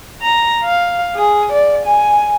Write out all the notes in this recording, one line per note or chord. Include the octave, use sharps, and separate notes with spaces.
A#5
F5
G#4
D5
G#5